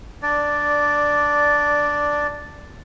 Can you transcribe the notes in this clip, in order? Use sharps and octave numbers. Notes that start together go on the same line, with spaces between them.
D4 D5